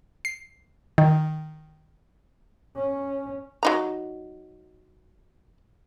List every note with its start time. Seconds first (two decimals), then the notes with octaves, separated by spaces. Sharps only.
0.25 C7
0.98 D#3
2.76 C#4
3.63 F#3 D#4 A#5